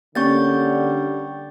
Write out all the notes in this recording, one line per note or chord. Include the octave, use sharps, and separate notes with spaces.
D3 G3 A#3 C#4 C#6 G6 A6